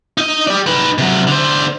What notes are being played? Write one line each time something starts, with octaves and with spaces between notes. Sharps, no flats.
D#4 D#5
G4 D5
D#4 B4
C3 F#3
D3 C5